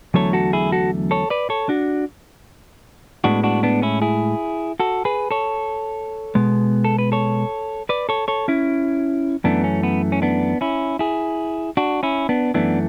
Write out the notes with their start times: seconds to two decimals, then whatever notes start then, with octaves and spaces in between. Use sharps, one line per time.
0.14 E2 D3 F#3 A3 A4 C#5
0.33 F#4 A4
0.53 E4 G#4
0.72 F#4 A4
1.11 A4 C#5
1.30 B4 D5
1.50 A4 C#5
1.69 D4 F#4
3.24 A2 G#3 B3 D4 F#4
3.44 D4 F#4
3.63 B3 D4
3.82 C#4 E4
4.02 E4 G#4
4.80 F#4 A4
5.05 G#4 B4
5.31 A4 C#5
6.35 B2 G#3 B3
6.85 A4
6.99 B4
7.12 A4 C#5
7.89 B4 D5
8.09 A4 C#5
8.28 A4 C#5
8.48 C#4 E4
9.44 F#2 E3 A3 B3 D4
9.64 C#4
9.83 B3
10.12 C#4
10.22 B3 D4
10.61 C#4 E4
10.99 E4 G#4
11.77 D4 F#4
12.03 C#4 E4
12.29 B3 D4
12.54 F#2 E3 A3 B3 D4